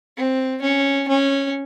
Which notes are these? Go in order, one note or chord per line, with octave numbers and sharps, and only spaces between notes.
C4
C#4
C#4